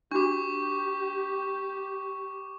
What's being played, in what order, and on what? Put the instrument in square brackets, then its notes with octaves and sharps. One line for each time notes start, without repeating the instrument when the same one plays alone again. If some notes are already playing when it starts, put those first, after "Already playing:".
[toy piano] D4 F#4 [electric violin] G4 [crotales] C#6 D6